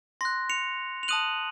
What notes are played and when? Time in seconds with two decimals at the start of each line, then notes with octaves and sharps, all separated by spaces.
0.21 C6 F#6 A#6
0.50 C#7 F7
1.03 F7
1.08 A5 D#6 F#6 D#7 F#7